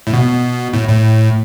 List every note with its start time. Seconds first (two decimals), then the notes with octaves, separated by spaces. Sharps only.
0.07 A2
0.13 B2
0.73 A2
0.88 A2